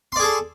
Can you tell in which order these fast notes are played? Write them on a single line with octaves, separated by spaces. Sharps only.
C6 D5 G#4 A4